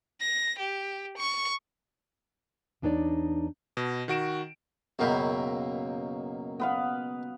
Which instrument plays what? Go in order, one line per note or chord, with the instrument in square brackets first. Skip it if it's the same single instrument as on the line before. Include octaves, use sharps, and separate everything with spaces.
[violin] A#6
G4
C#6
[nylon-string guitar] E2 D4 D#4 C#5 D5
[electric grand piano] B2
D#3 F#4 D7 E7
[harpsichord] C#2 B2 A#3 [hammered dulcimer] F#2 G5 B5
[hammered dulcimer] B3 B4 F5